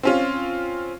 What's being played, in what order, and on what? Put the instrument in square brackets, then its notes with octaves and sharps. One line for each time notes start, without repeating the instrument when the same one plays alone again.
[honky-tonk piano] C4 C#4 F4